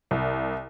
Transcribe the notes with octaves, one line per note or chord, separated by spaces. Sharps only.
C2